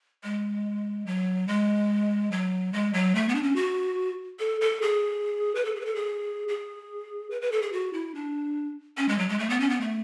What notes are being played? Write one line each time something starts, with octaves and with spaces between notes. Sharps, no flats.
G#3
F#3
G#3
F#3
G#3
F#3
A3
B3
D4
C#4
F#4
A4
A4
G#4
B4
A4
G#4
B4
A4
G#4
G#4
B4
B4
A4
G#4
F#4
E4
D4
C#4
G#3
F#3
G#3
A3
B3
C#4
B3
A3